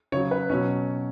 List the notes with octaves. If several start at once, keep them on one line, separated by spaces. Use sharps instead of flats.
C#3 F#3 C#5
B4
B2 F#3 C#4